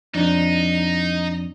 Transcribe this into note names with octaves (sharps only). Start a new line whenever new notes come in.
F2 D4 D#4